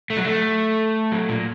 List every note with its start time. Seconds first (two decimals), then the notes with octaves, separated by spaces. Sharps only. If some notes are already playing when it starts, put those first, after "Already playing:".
0.10 A3
0.17 F#3
0.25 A3
1.12 F#3
1.29 A#2